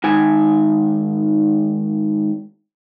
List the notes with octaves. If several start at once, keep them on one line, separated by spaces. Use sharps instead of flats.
G#2 D#3 G#5